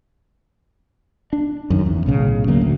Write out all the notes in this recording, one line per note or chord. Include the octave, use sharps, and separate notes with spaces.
D4
F#2 D#3
E2
B1 A2 C#3
D2 C#3 F#3 A#3
D2 A2